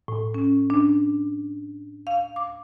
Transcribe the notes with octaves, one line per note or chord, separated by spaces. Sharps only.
A2
C#4
D4
F5
D6